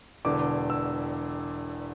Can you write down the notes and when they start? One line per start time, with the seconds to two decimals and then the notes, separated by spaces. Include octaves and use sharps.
0.25 E1 E2 D3 D6
0.70 E6